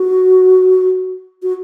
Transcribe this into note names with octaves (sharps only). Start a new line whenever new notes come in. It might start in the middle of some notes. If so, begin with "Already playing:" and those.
Already playing: F#4
F#4